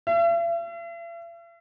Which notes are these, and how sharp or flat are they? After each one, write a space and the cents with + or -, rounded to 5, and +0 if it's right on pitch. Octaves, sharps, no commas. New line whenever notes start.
E5 +45